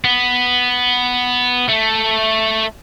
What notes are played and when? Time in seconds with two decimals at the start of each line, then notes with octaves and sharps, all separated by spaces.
0.04 B3
1.69 A3